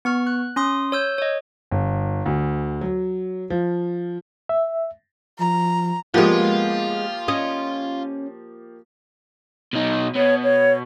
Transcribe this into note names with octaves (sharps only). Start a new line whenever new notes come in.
B3 C#6 F6
F#6
C#4 C6 D#6
C#5 E6 G6
C#5 D#5
G1
D2
F#3
F3
E5
F3 A#5
F3 G#3 A#3 B3 F4 G4
C#4 D#5
B2 D#4
B2 C#5
C#5